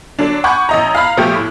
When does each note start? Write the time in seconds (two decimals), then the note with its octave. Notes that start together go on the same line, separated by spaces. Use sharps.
0.19 D3 F#3 D4
0.44 F#5 G#5 B5 C#6 D6 G6
0.69 A1 D#5 A#5
0.95 F5 A#5 B5 F6
1.17 A#2 F3 A3 G4
1.35 A2